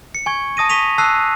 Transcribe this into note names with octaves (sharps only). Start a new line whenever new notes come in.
C#7
G#5 C#6 G#6
A5 D#6 A#6 D#7
C#6 B6 D#7 F7
A5 E6 F#6 C7